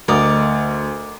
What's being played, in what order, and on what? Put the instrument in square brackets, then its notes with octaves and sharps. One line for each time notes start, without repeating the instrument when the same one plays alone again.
[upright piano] D2 [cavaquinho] A#4 D5 D#5